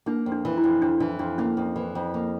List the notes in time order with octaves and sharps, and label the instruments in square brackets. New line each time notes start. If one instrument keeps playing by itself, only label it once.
[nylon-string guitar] A#3 [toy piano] D4
[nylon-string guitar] F2
[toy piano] D4
[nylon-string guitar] E3
[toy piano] E4
[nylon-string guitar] F2
[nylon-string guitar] F2 [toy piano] D4
[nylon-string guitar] E3 [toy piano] D4
[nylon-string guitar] F2 [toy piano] D4
[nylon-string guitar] A#3 [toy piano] C#4
[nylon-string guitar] F2
E3
F2
A#3